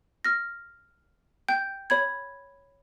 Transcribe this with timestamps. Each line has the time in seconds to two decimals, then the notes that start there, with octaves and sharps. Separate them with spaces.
0.25 F6 A#6
1.49 G5 G6
1.90 C#5 B5 G#6